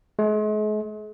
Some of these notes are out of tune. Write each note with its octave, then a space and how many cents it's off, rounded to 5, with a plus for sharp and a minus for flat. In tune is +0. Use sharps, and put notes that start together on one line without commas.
G#3 +40